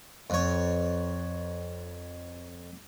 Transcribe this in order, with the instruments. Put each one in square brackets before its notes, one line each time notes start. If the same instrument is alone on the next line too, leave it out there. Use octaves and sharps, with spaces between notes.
[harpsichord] F2 C#5